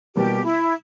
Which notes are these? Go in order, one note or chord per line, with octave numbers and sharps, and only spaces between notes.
B2 G3 A#3 G4
E4